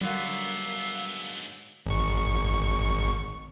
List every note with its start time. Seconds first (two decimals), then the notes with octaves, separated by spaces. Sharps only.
0.01 G#2 D3 F#3 G3 A#3 B3 E5 F5
1.86 G#1 C#6